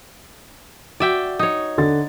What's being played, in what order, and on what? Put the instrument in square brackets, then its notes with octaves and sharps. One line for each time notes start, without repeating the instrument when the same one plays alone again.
[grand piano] F#4 [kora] D5 E5 G5
[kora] D#4 C#5
[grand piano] D3 A6